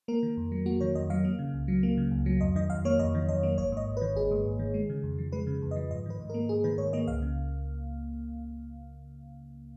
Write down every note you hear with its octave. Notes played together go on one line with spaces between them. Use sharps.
A#3 A#4
D#3
F2
F#3
A#3 F#4
D#3 C#5
F2 D#5
F#3 F5
A#3
C#3
C#2
F#3
A#3
C#3
C#2
F#3
F2 D#5
D#3 D#5
F2 F5
A#3 C#5
F2 D#5
D#3
F2 D#5
A#3
G#1 C#5
G#2 D#5
G#1
D#3 B4
G#1 G#4
G#2
G#1
D#3
G#3
C#3
F2
F3
G#3 B4
C#3
F2
F3 D#5
G#2 D#5
D#3 B4
G#2
A#3 A#4
G#2 G#4
D#3 B4
G#2 C#5
A#3 D#5
C#2 F5
C#3